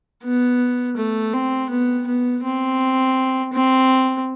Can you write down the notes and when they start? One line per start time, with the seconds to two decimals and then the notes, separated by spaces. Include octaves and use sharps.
0.23 B3
0.97 A3
1.33 C4
1.70 B3
2.07 B3
2.44 C4
3.53 C4